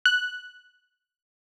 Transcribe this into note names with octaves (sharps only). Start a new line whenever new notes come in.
F#6